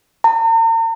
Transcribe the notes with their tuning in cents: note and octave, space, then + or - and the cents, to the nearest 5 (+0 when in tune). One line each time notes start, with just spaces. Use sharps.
A#5 -45